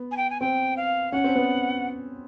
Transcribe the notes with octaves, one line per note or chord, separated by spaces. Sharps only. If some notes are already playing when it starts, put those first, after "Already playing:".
Already playing: B3
G#5
G5
G#5
C4 G5
F5
C#4 F#5
C4
B3